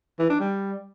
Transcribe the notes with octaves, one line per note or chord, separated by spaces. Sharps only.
E3
D4
G3